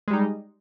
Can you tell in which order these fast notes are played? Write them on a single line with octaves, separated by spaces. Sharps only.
G#3 G3 D#4